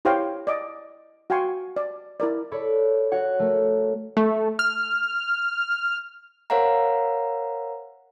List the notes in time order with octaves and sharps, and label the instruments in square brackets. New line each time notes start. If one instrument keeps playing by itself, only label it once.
[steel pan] E4 G4 C5 C#5 F5 G5
D5 D#5 D6
F#4 F5 G5 G#5 C6 C#6
D5
E4 A#4 D5
[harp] A4 C#5 D5 B5
F#4 C#5 F#5
A3 A4 A#4
[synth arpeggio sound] A3
F6
[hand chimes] A#4 C5 C#5 F5 F#5 A#5